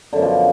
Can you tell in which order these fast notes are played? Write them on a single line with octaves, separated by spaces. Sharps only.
D3 F#2 B2 F3